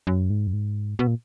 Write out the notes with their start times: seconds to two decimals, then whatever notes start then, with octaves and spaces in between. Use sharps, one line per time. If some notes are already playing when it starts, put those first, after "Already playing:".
0.07 F#2
0.30 G#2
0.47 F#2
0.53 G#2
0.99 B2
1.07 A#2